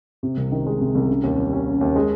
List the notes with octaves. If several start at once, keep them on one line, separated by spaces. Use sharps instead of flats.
C3
C2
D#3
G#3
C3
C2
C#3
D#2
G3
C#4
C#3
D#2
G#3